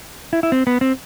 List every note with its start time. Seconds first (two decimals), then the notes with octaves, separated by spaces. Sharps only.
0.33 E4
0.43 E4
0.52 C4
0.67 B3
0.81 C4